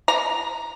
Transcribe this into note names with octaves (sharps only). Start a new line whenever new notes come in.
A#5